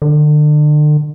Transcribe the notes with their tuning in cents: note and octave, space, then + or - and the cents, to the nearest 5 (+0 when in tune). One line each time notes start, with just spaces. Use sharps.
D3 +35